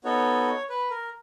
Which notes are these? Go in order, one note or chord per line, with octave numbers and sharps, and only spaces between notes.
B3 D#4 F#4 A4 C#5
B4
A#4